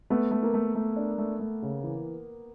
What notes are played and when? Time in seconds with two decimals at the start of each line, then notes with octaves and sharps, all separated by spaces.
0.10 A3 B3
0.31 A3
0.43 A#3
0.54 A3
0.75 A3
0.96 D4
1.18 A3
1.39 A3
1.62 C#3
1.84 E3